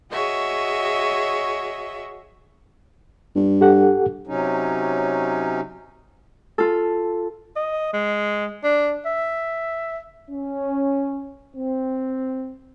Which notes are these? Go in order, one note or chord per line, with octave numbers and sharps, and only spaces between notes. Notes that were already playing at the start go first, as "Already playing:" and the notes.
F#4 G#4 C#5 D#5 E5
G2
G4 A4 F#5
C3 F#3 C#4 D#4
F4 A4
D#5
G#3
D4
E5
C#4
C4